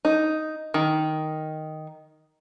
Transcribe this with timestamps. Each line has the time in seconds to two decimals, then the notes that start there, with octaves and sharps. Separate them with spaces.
0.05 D#4
0.74 D#3